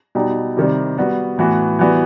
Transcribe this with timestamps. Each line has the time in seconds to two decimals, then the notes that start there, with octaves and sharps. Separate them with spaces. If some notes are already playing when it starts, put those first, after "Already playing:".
0.15 B2 G3 D#4 G4
0.57 C3 D#3 G3
0.97 G3 B3 F#4
1.38 A2 E3 B3 F#4
1.79 E3 G3 B3 F#4